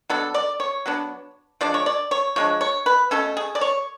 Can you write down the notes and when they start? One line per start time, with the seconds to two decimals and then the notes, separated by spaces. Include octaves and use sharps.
0.10 F#3 B3 D4 A4
0.34 D5
0.60 C#5
0.86 F#3 B3 D4
1.61 F3 G#3 D4 D5
1.74 C#5
1.86 D5
2.11 C#5
2.36 F3 G#3 D4 C#5
2.61 C#5
2.86 B4
3.11 B2 A3 C#4 A4
3.37 G#4
3.55 D5
3.61 C#5